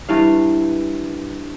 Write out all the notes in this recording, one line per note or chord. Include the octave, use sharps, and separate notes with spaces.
G2 E3 F5